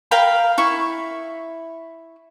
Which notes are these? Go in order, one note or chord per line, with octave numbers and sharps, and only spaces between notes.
A#4 F5 G5 B5
E4 C#6